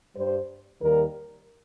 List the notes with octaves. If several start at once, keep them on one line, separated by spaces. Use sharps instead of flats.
G2 G3 C5
D#2 D#3 G3 A#4